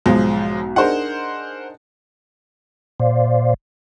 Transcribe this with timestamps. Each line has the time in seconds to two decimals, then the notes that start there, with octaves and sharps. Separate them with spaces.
0.06 B1 G#2 F3 G#3
0.76 D4 D#4 G#4 A#4 C5 F#5
3.00 A#2 C5 D5 F5